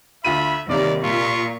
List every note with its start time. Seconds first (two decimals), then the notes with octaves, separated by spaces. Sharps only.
0.24 D2 F4 E5 B5 D#7
0.69 D#2 C3 G3 D5 F5
1.03 A#2 F4 C#6